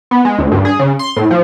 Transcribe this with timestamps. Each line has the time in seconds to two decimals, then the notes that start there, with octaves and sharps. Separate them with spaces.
0.11 B3
0.25 G#3
0.39 D2
0.52 G2
0.65 G#4
0.79 C#3
0.99 C6
1.16 A2
1.31 F3